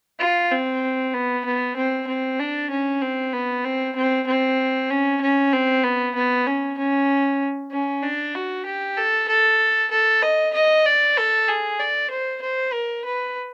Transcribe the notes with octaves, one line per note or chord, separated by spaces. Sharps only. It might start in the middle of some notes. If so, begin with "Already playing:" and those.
F4
C4
B3
B3
C4
C4
D4
C#4
C4
B3
C4
C4
C4
C#4
C#4
C4
B3
B3
C#4
C#4
C#4
D4
F#4
G4
A4
A4
A4
D#5
D#5
D5
A4
G#4
D5
C5
C5
A#4
B4